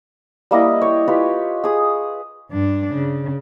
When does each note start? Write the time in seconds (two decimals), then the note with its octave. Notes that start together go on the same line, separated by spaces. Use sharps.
0.51 G3 A#3 E4 D#5
0.82 C#5 G5
1.08 F4 G4 B4
1.64 G#4 D#6
2.51 G2 D4
2.93 C#3